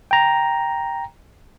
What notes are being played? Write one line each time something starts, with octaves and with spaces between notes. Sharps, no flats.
G5 A#5